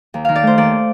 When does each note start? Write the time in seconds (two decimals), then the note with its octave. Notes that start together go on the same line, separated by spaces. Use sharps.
0.14 D#2
0.25 D#3 F5
0.35 D5
0.43 A3 C5
0.58 D#2 D5